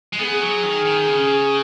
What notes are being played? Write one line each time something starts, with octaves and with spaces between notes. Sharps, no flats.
G#3
B3 G#4
F#3
D#3
D#3
C#3